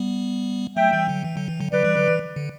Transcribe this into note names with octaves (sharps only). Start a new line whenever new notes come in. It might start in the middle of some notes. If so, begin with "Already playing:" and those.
Already playing: G3 B3
F#3 A3 E5 G5
E3 G3
D3 F#3
E3
D3 F#3
E3
D3 F#3
D3 F#3 B4 D5
E3 G3
D3 F#3
E3
D3